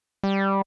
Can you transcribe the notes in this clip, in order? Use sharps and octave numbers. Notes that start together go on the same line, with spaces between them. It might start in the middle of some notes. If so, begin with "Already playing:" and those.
G3